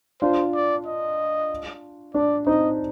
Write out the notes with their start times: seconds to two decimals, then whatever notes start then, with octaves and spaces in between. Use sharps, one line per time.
0.22 D4 F4 C5
0.54 D5
0.86 D#5
2.14 D4 D5
2.46 C4 D#4 D#5